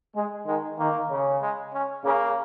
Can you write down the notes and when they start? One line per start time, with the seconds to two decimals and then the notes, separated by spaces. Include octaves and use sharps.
0.15 G#3
0.46 D#3 G#3
0.79 D#3 A#3
1.10 C#3
1.41 G#3
1.74 C#4
2.05 C#3 A#3